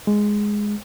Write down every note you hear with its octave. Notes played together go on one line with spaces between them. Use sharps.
G#3